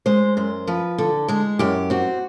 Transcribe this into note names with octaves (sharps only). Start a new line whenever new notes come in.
G#3 C5
F#2 C5
F3 B4
D3 A4
G#3 G#4
F#2 G4
C4 F#4